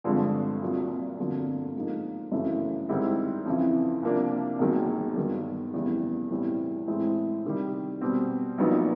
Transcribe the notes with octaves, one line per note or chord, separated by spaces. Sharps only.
G#1 G2 D3 F3 G#3
C2 A#2 F#3
G1 F2 D3 F#3 A#3
G#2 F3 A#3 D#4
F#2 C#3 E3 A3
G#2 D#3 G3 C4 E4
F2 C#3 E3
C2 C3 F3 A#3 D4
E1 D#2 D#3 F#3
G2 D#3 F#3
F1 E2 C#3 E3 G3
B1 A2 E3 G3 C4
A2 E3 G#3 C4
C3 D#3 G3
B2 G3 C4
A#1 A#2 F#3 B3 D#4